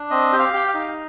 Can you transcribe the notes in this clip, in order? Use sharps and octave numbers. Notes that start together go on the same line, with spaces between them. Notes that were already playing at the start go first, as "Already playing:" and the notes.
Already playing: D4
C4 D#5
G4 G5
F5
G4 G5
F5
D#4